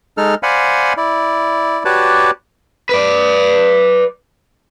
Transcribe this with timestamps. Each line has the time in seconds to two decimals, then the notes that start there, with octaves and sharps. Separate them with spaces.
0.18 G#3 D#4 A4 F6
0.43 C5 D5 F5 F#5 G#5 B5
0.97 E4 D5
1.85 F#4 G4 B4 C#5 D5 A5
2.89 B4 D5